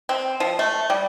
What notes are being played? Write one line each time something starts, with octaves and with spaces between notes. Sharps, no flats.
C4
F3
A3
G3